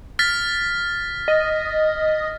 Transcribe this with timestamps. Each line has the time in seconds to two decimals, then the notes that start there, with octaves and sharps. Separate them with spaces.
0.19 F6 A6 B6
1.28 D#5